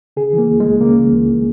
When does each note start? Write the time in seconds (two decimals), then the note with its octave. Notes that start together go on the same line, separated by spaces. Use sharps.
0.17 C#3 G#4
0.33 E3
0.38 A#3
0.49 C#2
0.60 C#2 G#3
0.81 C#3 A#3
0.98 E3
1.13 C#2